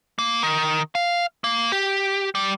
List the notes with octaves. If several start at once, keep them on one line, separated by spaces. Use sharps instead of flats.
A#3
D#3
F5
A#3
G4
G3